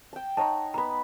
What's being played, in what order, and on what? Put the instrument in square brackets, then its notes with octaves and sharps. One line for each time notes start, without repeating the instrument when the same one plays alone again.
[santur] G5 A5
[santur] D#4 C#5 F#5 [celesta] A5 A#5
[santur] B3 B4 [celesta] A#5 B5